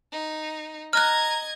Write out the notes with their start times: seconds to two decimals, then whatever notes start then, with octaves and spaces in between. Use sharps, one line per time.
0.12 D#4
0.93 D#5 A#5 F6 F#6 G#6